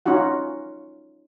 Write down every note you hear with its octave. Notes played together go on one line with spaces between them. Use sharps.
C#4 D#4 F4 F#4 F#5